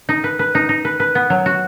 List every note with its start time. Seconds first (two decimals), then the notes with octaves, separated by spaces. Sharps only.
0.09 D#4
0.24 B4
0.39 B4
0.55 D#4
0.69 D#4
0.85 B4
1.00 B4
1.15 B3
1.30 F#3
1.46 F#4